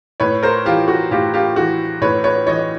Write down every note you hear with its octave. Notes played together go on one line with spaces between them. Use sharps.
A2 B4 C#5
A#4 C5
E3 F4 G4
F#4
A2 F4 G4
F4 G4
E3 F#4
A2 B4 C#5
B4 C#5
E3 C#5 D#5